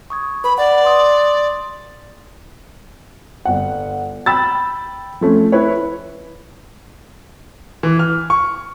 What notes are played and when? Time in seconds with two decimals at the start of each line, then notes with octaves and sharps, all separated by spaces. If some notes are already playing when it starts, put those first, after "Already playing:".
0.10 C#6 D#6 G#6
0.44 B4 B5
0.58 D5 F#5
0.85 C6 D#6
3.45 G1 F#5
4.26 G5 B5 E6 A6
5.21 F3 A3 C#4
5.52 E4 B4 C#5
7.83 E3
7.99 F6
8.30 C#6